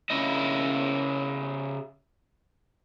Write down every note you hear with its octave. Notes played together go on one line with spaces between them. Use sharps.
C#3 E4 D#5